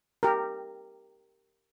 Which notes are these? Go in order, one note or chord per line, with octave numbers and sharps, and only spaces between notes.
G4 A#4